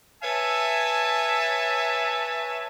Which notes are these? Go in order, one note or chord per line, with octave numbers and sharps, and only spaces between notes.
B4 C#5 E5 G#5 A5